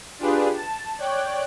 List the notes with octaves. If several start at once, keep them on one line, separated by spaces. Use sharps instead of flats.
D4 F4 G4 G#4 B4
A5
C#5 D5 G5 F#6